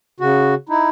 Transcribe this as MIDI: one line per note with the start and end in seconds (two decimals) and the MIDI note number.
0.20 0.54 49
0.20 0.54 66
0.69 0.90 63
0.69 0.90 64